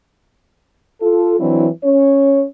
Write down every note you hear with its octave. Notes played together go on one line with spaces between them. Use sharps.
F4 A4
E3 F#3 C4 D4 E4
C#4 C#5